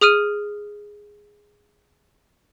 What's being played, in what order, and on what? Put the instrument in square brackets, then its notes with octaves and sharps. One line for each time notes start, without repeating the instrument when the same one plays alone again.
[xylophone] G#4 D#6 F6 D#7